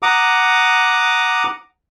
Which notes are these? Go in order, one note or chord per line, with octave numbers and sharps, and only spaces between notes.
F#5 A#5 D6 D#6